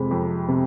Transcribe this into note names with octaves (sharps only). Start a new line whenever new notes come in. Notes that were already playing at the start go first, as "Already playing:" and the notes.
Already playing: F2 C3 G#3 B5
F2
C3